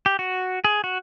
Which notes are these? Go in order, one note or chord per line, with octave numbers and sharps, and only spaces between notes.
G4
F#4
G#4
F#4